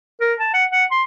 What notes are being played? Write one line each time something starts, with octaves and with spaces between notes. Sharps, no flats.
A#4
A5
F#5
F#5
C6